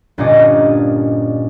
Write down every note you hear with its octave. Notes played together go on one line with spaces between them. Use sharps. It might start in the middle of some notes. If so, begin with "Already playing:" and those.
G1 A#2 A#3 C#4 D5 D#5